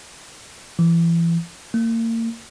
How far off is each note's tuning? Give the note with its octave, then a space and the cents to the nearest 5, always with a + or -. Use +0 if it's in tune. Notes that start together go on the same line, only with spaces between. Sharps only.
E3 +30
A#3 -35